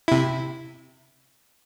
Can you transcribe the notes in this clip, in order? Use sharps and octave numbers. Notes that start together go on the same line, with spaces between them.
C3 E4